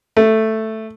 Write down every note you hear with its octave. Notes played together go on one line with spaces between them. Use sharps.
A3